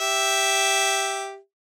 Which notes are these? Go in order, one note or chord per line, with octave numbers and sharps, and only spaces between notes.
G4 E5